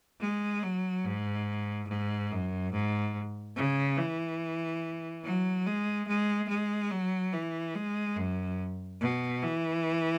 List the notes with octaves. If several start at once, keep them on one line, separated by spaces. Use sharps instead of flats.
G#3
F#3
G#2
G#2
F#2
G#2
C#3
E3
F#3
G#3
G#3
G#3
F#3
E3
G#3
F#2
B2
E3